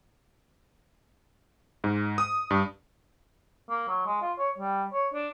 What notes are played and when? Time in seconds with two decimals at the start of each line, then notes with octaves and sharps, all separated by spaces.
1.84 G#2
2.18 D#6
2.51 G2
3.70 A#3
3.88 F#3
4.06 G#3
4.21 F4
4.38 C#5
4.58 G3
4.93 C#5
5.14 D4